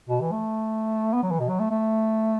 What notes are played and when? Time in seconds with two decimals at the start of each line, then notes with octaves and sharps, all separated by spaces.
0.09 B2
0.21 E3
0.32 A3
1.13 B3
1.23 F#3
1.31 E3
1.40 B2
1.49 F#3
1.60 A3
1.71 A3